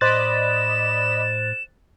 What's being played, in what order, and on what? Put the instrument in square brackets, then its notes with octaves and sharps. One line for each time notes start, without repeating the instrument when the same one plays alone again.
[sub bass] A2 [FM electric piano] C5 F#6 A6 [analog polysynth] D5 D#5 B5 [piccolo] E7